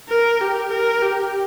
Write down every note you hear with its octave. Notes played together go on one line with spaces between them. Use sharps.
A#4
G4
A#4
G4